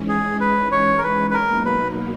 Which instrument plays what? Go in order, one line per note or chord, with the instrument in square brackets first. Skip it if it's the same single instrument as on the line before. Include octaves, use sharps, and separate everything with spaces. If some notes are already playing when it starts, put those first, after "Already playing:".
Already playing: [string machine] G#2 E3 G#3 C#4
[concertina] G#4
B4
C#5
A#4
B4
B4
[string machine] B2 F#3 A#3 D#4 [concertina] A#4
[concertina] B4